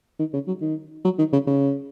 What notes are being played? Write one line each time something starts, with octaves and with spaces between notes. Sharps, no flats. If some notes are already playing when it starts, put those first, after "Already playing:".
D#3
C#3
F#3
D#3
F#3
D#3
C#3
C#3